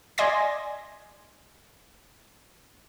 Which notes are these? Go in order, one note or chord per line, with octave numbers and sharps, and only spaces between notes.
D5 D#5 G#5 C6 G#6 A#6